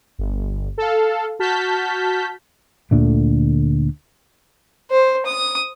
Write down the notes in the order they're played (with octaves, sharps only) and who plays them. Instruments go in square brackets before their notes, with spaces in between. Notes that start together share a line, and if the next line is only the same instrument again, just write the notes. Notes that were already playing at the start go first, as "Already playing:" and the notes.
[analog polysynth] G1
A4 F5
F#4 A5 F6 G6 B6
[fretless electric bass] D2 A#2 D3 A3
[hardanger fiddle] C5
D#6